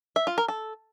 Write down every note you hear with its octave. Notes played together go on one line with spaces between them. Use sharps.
E5
F4
A#4
A4